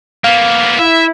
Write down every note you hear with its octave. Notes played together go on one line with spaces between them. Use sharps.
A#3 B3 F5
E4 E5